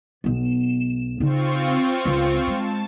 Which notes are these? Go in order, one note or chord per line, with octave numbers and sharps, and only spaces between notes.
B1 B3 E7
C#3 C4 D#4 F4 C#6
C#2
G#3 A5